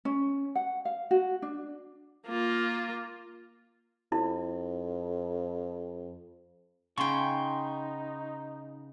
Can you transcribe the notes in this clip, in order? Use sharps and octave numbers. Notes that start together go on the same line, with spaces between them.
C#4
F#5
F5
F#4
D4
A#3 F4
F2 E4
C#3 B3 D#4 G5 G#5 C6 C#6